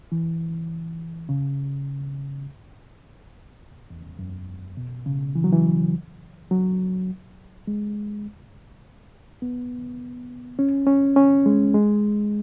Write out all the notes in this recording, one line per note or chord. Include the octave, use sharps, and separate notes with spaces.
E3
C#3
E2
F#2
B2
C#3
E3
F#3
E3
F#3
G#3
B3
C#4
C#4
C#4
G#3
G#3